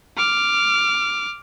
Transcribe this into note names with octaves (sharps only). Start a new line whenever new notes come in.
D6 F6